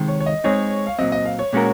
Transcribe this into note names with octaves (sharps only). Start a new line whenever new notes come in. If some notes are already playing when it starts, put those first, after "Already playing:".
Already playing: C3 D#3 G#3
C#5
C#5
D#5
G#3 C4 D#4 G#4 C#5
F5
A#2 F#3 C4 D#5
D#5
F5
C#5
A#2 G#3 C#4 F#4 A#4